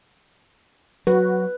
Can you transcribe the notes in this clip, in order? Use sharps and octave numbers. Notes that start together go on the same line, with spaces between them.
F#3 F#4 B4